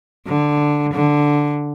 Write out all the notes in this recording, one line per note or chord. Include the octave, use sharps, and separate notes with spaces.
D3
D3